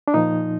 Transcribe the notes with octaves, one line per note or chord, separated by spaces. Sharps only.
D4
A#2 F3 D#4